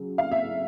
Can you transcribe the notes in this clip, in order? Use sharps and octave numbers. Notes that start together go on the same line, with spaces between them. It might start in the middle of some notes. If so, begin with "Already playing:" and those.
Already playing: C#3 F#3
F5
E5